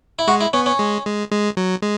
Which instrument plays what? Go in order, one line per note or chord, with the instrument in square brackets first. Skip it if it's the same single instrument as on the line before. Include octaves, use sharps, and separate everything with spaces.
[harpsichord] E4
[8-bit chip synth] G#3 [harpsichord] F#4
[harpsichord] E4
[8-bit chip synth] B3 [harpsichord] C#4
[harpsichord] C#4
[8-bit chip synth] G#3
G#3
G#3
F#3
G#3